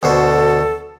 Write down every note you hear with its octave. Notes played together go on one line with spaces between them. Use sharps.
D2 B2 A4 C5